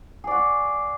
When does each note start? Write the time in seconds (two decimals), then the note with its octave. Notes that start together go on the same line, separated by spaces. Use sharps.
0.24 G#4
0.27 D5
0.31 F#4